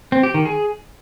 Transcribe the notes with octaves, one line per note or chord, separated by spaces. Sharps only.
C4
G4
D#3
G#4